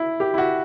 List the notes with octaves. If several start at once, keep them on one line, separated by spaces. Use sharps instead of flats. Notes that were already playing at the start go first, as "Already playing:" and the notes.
Already playing: E4
G4
E4
F#4